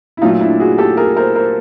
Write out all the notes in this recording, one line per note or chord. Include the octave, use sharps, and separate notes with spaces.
E4
A#2 F#3 A3 D#4 F4
D4 E4
F#4 G#4
G4 A4
G#4 A#4
A#4 C5
A#4 C5